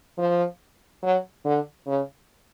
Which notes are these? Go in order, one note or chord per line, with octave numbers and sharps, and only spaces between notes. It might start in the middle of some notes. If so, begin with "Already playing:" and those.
F3
F#3
D3
C#3